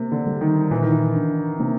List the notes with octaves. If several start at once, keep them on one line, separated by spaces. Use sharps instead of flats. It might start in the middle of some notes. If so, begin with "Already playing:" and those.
Already playing: C3 A#3
D3
G3
D#3
A#2 E3
D#3
E3
D4
C3 A#3